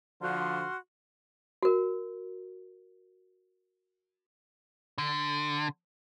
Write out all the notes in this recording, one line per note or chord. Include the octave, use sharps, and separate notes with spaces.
D3 F3 F#4 C6 F6
F#4 A#4
D3